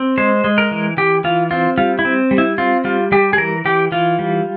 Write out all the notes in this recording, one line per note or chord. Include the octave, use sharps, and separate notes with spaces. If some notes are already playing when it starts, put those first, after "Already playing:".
Already playing: C4
G#3 C5
G#3
A#4
E3
E3 G4
E3 F4
C4 F4
G3 F4
E4
C4
G3
E4
C4 F4
G3 F4
G3 G4
G#4
E3 A#4
E3 G4
E3 F4
G3